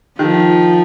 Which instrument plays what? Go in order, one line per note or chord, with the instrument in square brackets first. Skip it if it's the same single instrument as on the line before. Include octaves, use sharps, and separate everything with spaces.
[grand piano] D#3 [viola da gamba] F3